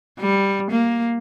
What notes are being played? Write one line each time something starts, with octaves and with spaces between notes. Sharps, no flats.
G3
A#3